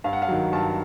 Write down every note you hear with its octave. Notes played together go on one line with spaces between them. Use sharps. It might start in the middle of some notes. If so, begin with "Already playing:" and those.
G2 F5
F#5
F5
D#3 F#3
G2 A5